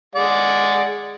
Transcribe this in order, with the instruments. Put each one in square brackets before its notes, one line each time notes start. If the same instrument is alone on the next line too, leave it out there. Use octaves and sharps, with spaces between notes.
[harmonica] G#3 D5 F#5